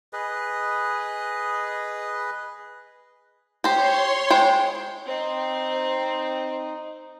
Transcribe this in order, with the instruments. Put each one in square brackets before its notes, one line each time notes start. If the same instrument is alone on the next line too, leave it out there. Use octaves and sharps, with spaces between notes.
[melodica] G#4 B4 D#5
[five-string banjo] G4 C5 [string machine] C#5 C6
[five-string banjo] G#3 C5 G5
[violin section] C4 [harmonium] D#4